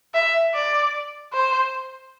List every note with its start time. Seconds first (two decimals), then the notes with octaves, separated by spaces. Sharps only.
0.14 E5
0.54 D5
1.33 C5